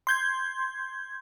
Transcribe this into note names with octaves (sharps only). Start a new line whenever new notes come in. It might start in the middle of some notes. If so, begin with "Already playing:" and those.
C6 G6 G#6